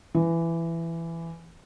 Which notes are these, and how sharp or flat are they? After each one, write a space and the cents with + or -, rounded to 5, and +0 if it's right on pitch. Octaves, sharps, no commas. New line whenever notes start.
E3 +15